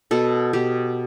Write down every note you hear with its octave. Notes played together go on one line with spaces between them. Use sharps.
B2 A4
B2 G4